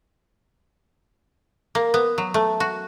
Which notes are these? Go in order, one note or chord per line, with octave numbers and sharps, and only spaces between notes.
A#3
B3
F#3
A3
F#4